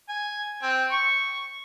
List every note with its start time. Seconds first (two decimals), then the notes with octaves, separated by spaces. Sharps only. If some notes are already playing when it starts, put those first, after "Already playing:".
0.09 G#5
0.62 C4
0.92 C#6